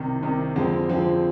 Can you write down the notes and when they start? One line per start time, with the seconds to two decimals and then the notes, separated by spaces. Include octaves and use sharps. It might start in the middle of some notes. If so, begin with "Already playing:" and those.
Already playing: C2 C3 D#3
0.23 C2 C3 D#3
0.56 F2 D3 F3 G#3 C4
0.89 F2 D3 F3 G#3 C4